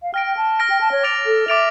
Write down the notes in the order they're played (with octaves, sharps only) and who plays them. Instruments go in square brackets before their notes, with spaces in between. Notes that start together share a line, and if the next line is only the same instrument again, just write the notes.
[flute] F5
[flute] G5 [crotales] F6 A#6 D7
[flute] G5
A5
[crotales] F6 A#6 D7
[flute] G5
A5
C#5
[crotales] D6 A6 D7 F7
[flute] A4
[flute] E5 [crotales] D6 A6 D7 F7